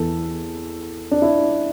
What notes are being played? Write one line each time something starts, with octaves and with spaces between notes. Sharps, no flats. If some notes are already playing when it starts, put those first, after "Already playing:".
Already playing: E2 E3 A4
D4
E4